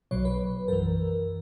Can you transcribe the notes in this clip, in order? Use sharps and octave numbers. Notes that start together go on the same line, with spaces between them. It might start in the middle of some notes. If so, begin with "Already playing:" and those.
B1 B2 F#3 C#5
B4
F#2 E3 A#4